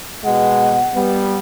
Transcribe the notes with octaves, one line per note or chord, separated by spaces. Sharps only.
B2 G#3 F#5
G3 B3